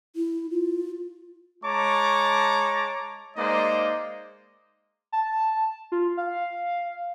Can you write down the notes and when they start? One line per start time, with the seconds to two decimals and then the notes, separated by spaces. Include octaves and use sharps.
0.16 E4
0.51 F4
1.63 G#3 C#5 A5 A#5 C#6 D6
3.37 G#3 A#3 D#4 C5 D5 D#5
5.12 A5
5.92 F4
6.17 F5